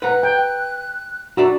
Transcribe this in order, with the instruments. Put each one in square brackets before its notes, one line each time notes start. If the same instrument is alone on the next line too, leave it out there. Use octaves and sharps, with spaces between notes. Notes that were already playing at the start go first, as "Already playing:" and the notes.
[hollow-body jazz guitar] B4 F#5 A#5 [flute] F#6
[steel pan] G5
[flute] D4 [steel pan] F#4 [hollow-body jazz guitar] D5 E5 A#5